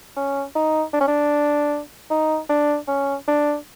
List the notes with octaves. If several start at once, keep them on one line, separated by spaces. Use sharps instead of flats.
C#4
D#4
D4
C#4
D4
D#4
D4
C#4
D4